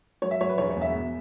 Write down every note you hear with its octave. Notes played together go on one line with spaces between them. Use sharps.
F#3 C#5
E5
F#3 C#5
B4
E1 C#5
C#5
E2
E5
B2